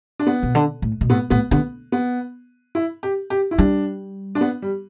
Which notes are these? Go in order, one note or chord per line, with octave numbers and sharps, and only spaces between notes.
D4
B3
B2
D3
A2
B2
A2 B3
A2 B3
D3 B3
B3
E4
G4
G4
E4
G3 D4
D4
B3
G3